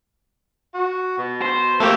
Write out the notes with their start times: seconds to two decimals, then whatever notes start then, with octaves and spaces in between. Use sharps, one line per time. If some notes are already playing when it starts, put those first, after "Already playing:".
0.74 F#4
1.18 B2
1.42 C5
1.80 A3 A#3 C4 G4 A4